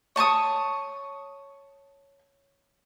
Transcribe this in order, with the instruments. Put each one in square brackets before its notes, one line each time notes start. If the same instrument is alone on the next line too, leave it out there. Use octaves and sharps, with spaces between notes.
[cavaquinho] C#5 A5 C#6 D#6